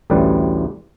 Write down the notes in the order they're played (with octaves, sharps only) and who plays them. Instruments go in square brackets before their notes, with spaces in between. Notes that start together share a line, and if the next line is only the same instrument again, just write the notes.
[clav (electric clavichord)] A1 D2 A2 G3 B4 D5